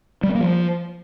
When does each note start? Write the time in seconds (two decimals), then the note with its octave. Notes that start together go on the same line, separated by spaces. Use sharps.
0.23 G3
0.29 C4
0.35 A#3
0.41 F3